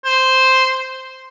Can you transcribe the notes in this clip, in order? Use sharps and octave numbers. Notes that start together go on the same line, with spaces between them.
C5